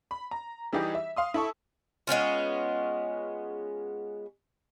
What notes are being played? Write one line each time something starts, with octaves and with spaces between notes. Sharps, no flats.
B5
A#5
E3 G3 D#4 G4 G#4 D#5
E5
F5 C6 D#6
E4 A4 C#6
G#3 B3 C#4 F4